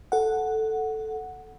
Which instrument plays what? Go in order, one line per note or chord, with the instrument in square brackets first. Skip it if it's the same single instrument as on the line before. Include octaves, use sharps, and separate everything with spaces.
[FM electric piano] A4 F#5